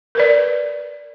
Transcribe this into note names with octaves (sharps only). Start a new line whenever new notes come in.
A#4 B4 D5